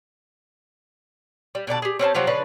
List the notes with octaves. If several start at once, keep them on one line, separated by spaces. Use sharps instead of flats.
G3
B2 D3 D5 A5
G4 G#4
C4 C#4 C5 A5
C3 F3 F#3 C4
C#3 F3 D4 B4